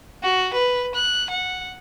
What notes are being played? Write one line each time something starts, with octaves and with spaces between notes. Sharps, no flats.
F#4
B4
F#6
F#5